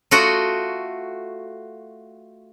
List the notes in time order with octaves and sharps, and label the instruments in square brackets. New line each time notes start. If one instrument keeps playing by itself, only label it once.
[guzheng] A3 F4 F#4 D#5 F#5